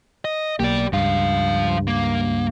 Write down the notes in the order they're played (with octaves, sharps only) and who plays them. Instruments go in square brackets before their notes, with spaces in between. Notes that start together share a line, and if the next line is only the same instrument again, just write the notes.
[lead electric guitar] D#5
[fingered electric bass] B1 A#3 [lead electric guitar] G4 D5
[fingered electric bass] C#2 G2 [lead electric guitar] F3 F5
[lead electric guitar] A#3